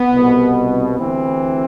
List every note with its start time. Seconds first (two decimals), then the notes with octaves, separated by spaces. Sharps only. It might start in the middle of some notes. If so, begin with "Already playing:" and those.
Already playing: B3
0.11 C2 B2
0.99 D2 C3 E3 C4